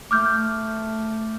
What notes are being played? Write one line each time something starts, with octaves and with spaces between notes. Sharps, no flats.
A3 D6 F6 G6